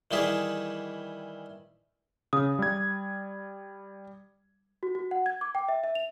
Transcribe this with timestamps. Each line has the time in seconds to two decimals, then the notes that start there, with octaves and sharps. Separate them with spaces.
0.11 D#3 E3 G3 E4 G#4
2.33 C#3 D#6
2.59 G3 G#6
4.83 F#4
4.95 F#4
5.11 F#5
5.26 G#6
5.41 D6
5.55 G5
5.68 E5
5.84 E5
5.95 F7